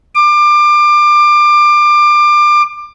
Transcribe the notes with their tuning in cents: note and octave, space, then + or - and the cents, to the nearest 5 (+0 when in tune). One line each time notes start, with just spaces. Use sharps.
D6 +25